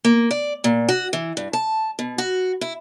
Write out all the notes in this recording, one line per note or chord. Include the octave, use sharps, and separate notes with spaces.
A#3
D5
A#2
F#4
E3
G2
A5
B2
F#4
E4